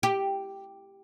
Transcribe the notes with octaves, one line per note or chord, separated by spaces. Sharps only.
G4